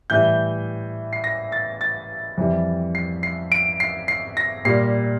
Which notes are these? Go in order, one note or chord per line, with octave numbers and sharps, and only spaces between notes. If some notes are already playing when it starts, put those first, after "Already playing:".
A2 E3 G3 G6
C7
A#6
A6
A6
F2 E3 G3
C7
C7
D7
C7
C7
A#6
A#2 G3 C7